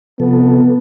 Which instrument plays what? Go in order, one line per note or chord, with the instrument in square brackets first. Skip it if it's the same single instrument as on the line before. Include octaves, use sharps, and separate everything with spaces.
[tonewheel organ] C3 F3 A4 [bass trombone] B3